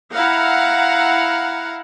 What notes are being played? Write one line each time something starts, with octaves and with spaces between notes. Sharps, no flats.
E4 F5 F#5 A#5